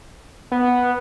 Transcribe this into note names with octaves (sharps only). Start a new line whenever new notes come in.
B3